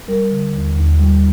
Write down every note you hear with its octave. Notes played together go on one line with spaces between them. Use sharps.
G3 A#4
D3
D#2
D#2
G3